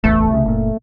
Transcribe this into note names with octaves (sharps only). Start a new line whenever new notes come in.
D1 A1 E2 A3
C2 C#3
F#1 A#2